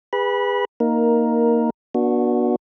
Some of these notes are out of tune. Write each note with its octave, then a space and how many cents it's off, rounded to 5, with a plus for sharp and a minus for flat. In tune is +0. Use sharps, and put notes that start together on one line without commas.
G#4 -35 B4 +0 B5 -25
A#3 +0 D#4 +0 A#4 +10
B3 -40 D4 +0 F#4 -10